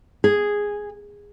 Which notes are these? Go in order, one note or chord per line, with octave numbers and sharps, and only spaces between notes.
G#4